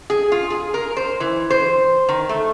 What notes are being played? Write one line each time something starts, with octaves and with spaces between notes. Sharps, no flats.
G#4
F4
G#4
A#4
C5
E3
C5
D#3
A3